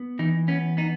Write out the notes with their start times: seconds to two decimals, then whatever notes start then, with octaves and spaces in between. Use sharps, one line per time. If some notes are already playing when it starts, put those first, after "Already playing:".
Already playing: B3
0.19 E3 D#4
0.48 B3 C#4
0.77 B3 D#4